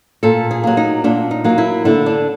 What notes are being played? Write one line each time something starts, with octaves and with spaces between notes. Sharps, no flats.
A#2 A4
G#4
F#3 A#3
D#4
A#2 D4
D#4
F#3 A#3
E4
D3 E4
D4